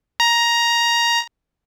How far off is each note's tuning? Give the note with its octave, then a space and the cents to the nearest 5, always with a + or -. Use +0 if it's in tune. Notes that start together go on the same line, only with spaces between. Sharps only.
A#5 +10